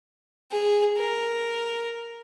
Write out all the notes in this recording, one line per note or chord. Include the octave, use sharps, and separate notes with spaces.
G#4
A#4